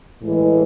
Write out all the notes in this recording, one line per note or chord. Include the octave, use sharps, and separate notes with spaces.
A2 E3 G#3